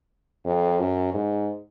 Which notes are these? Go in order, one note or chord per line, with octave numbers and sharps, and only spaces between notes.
F2
F#2
G#2